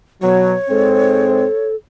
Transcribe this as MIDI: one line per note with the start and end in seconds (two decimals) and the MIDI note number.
0.22 0.55 47
0.22 0.55 54
0.22 1.68 73
0.70 1.46 44
0.70 1.46 56
0.70 1.46 60
0.70 1.75 69